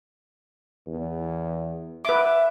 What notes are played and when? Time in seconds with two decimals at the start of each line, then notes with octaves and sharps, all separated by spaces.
0.87 E2
2.05 B4 E5 D6